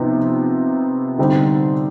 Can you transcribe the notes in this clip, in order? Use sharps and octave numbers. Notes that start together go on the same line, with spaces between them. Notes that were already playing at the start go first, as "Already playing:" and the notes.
Already playing: C3 F3 B3 D#4
D3 G3 C4 D#4